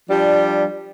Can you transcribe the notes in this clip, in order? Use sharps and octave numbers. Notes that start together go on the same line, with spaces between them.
F3 G3 D4 G4